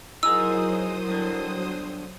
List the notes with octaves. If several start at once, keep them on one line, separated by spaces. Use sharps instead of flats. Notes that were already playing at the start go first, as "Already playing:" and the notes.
F#3 D#4 E4 G#4 A#4 C5 D#6 E6
G2 D3